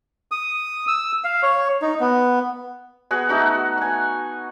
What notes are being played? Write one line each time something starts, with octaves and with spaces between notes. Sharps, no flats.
D#6
E6
F5
C#5
D#4
B3
B3 F#4 G#4
A3 D#4 F#4
F#5 G#5